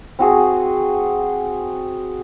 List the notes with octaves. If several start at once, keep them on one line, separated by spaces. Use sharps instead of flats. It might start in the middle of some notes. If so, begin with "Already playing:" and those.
C4 F#4 G#4